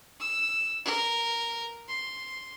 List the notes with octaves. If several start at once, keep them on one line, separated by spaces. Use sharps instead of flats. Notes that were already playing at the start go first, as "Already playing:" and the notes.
E6
A#4
C6